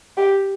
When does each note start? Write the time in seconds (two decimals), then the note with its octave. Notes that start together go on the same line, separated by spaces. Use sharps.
0.17 G4